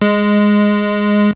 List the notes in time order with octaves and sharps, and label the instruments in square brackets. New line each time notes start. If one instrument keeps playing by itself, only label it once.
[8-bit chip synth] G#3